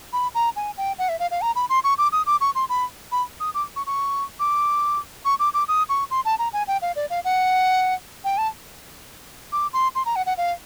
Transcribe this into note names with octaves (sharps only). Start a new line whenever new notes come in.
B5
A#5
G#5
G5
F#5
E5
F5
F5
A#5
B5
C6
C#6
D6
D#6
D6
C#6
C6
B5
B5
D#6
D6
C#6
C#6
D6
C#6
D6
D6
D#6
C#6
C6
A5
A#5
G#5
G5
F5
D5
F5
F#5
G5
A5
D6
C6
C6
A#5
F#5
F#5
F5